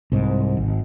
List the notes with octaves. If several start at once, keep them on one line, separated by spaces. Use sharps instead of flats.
C2 G#2
G#1